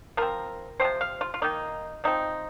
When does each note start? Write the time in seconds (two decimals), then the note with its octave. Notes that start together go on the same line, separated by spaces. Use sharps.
0.17 F3 C4 A#4
0.80 C3 F3 C4 C5
1.01 F5
1.21 F4
1.34 F4
1.42 D#3 A#3 D#4
2.04 F3 C4 D#4